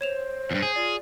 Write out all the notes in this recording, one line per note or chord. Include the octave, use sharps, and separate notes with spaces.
C5 C#5 E7 F7
E2 G2
G#4
F4 D5